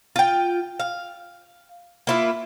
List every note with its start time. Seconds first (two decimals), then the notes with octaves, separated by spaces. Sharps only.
0.16 F4 G5
0.80 F5
2.07 A#3 E4 F4